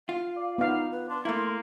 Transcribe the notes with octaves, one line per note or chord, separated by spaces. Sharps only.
F4 F5
D5
B3 D#4 F5
B4
D4 C6
A3 A#3 E4